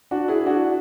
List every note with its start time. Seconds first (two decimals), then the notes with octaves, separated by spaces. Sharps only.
0.11 D4 F#4
0.28 E4 G#4
0.46 D4 F#4